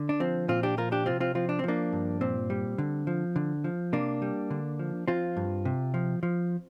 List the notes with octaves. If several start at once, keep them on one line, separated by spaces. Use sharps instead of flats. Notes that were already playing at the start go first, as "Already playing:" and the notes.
Already playing: D3
D4
F3 C4
A#2 C4 F4
D4 G4
F3 F4 A#4
D4 G4
C3 C4 F4
C4 F4
F3 C4 F4
D4
C4
F3 A#3 D4
G2
A#2 C4
G3
D3
F3
D3
F3
C3 A#3 D4
G3
D3
F3
F3 C4 F4
G2
C3
F3
F3